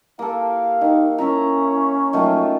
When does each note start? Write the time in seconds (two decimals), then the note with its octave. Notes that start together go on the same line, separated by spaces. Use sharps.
0.19 A#3 E4 G4 A4 F5
0.81 D#3 D#4
1.18 C#4 E4 A#4 E5 A#5
2.13 A#1 D#3 F#3 A3 F4